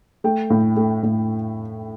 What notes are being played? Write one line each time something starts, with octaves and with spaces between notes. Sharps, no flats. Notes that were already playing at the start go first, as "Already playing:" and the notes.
A3 G5
A2
A3
A2